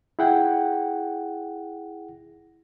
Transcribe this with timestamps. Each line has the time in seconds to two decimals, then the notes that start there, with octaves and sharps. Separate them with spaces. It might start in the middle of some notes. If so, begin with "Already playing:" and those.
0.19 E4 G#4 F#5 G5